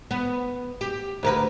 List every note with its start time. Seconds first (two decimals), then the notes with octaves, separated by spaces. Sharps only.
0.11 B3
0.81 G4
1.23 D2 A#4 B4